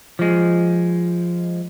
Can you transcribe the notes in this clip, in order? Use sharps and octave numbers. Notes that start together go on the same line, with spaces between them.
F3 G#3